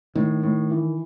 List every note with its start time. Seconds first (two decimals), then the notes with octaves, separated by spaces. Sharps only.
0.15 A2 D#3
0.43 A2
0.71 E3